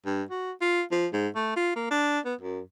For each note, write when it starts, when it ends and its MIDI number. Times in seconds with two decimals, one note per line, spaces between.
0.06 0.23 43
0.31 0.52 66
0.61 0.83 65
0.92 1.07 53
1.13 1.28 44
1.36 1.54 57
1.56 1.72 65
1.76 1.90 58
1.91 2.20 62
2.25 2.35 59
2.41 2.60 42